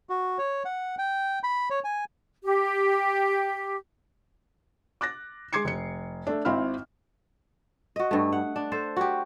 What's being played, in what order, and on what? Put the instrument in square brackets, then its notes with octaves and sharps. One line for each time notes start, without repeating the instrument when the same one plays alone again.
[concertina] F#4
C#5
F#5
G5
B5
C#5
G#5
[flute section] G4
[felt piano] D6 F#6 A6 A#6
G#3 C6 D6 G#6 C7 C#7
F1 C#7
A3 D4
G#1 C4 E4 F5 B5 F6
[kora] F#4 D#5
G2 A3
F#5
D4
A4 C5
F#4 G4